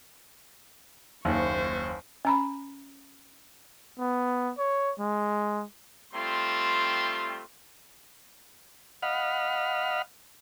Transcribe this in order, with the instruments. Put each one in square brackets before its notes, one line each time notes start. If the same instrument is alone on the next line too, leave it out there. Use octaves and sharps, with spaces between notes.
[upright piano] F#1 D#2 [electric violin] C5 C#6
[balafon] C#4 A#5 B5
[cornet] B3
C#5
G#3
[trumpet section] G3 A3 C4 F4 C6
[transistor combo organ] D#5 F5 F#5 B5 F6